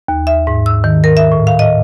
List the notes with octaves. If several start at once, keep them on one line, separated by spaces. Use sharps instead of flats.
D#2
E5
G#2
E6
D#3
A#4
E5
A2
F5
D#5